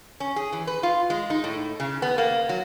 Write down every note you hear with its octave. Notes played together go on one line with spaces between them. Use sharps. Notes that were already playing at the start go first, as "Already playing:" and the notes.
C#4
G#4
E3
B4
F4
G#3
D#4
A2
C#3
B3
A#3
F#3